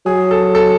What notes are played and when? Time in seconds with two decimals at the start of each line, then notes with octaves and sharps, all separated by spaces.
0.06 F#3 G#4
0.31 A4
0.55 A4